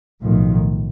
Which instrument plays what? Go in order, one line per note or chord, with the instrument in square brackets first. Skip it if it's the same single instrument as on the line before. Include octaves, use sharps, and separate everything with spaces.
[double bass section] B1 A2 D#3 F3